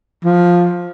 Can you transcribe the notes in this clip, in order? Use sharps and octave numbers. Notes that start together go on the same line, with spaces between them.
F3